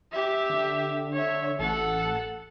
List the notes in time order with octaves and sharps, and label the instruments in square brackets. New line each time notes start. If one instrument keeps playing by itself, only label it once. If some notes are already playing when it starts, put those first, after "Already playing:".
[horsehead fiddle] G4 E5
[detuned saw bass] D3
[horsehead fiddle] C#5 E5
[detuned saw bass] A1 [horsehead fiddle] A4 F#5